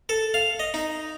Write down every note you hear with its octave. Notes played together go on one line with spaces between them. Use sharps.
A4
F5
D#5
D#4